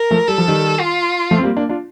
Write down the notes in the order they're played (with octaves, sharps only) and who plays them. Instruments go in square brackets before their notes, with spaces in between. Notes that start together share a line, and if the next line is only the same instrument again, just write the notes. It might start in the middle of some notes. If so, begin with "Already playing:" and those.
Already playing: [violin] A#4
[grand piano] F3 A3
[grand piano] G3 [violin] A4
[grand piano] F3
D#3 G3
[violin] F4
[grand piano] F3 A3
C4
G3 A#3
A#3 D4
D4 F4